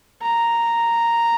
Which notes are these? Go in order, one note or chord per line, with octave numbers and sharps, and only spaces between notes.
A#5